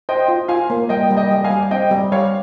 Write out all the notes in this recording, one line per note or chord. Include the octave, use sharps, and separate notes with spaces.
C5 D#5 G5
F4
F4 F5 G#5
A#3
G3 D#5 G5
G3
D#5 G5
G3
F5 G#5
G3
C4 D#5 G5
G3
G3 C#5 F5